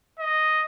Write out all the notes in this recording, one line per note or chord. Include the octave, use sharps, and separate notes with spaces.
D#5